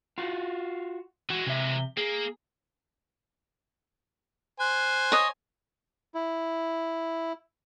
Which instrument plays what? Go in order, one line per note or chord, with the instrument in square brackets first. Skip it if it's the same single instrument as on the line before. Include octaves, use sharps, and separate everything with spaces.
[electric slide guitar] F4 F#4
[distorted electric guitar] E3 G#3 [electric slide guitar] F#4
[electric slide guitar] C3 E5
[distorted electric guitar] A#3 [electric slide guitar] G#4
[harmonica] C5 G#5 [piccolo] F#6
[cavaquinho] C#5 D#5
[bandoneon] E4